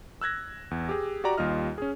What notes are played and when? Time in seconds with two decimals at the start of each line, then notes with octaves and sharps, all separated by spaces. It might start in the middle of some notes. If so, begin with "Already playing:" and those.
0.21 E6 F#6 G#6 A#6
0.71 E2
0.89 G4 G#4
1.24 F#4 G4 D5 A#5
1.38 D#2 G3 F4 D#5 F6
1.78 C#4 G#4